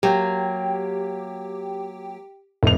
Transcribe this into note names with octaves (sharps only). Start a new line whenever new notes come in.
F#3 A#3 G4 G5
F1 A2 F7